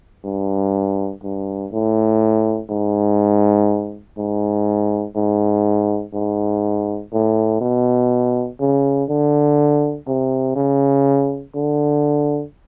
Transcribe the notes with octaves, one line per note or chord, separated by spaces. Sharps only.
G2
G2
A2
G#2
G#2
G#2
G#2
A2
B2
C#3
D3
C3
C#3
D3